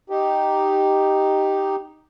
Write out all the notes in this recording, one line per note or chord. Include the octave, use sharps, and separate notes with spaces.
D#4 G4